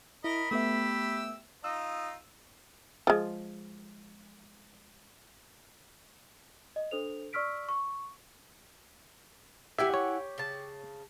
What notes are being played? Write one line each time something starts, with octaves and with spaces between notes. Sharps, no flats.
E4 A#4 D#5 B5
A3 B3 G4 E5 E6
D#4 F4 D#5 E6
F3 G#3
D#5
D4 A4 C5 F7
D5 C#6 E6 F6 B6 D7
C#6
E4 G4 E5 F#5 G#5
C#5
C#3 A5